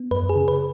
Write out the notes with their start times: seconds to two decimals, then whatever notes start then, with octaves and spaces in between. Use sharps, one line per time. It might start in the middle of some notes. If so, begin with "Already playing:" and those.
Already playing: B3
0.11 F#2 B4
0.29 G#4
0.36 C#3
0.48 B4